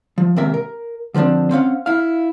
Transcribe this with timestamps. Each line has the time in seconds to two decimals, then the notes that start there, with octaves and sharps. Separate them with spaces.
0.18 F3
0.36 D#2 G#2 C3 A#4 E5
0.54 A#4
1.14 D3 F3 A#3 C4 D4
1.51 C4 C#4 F5 F#5
1.86 E4 F5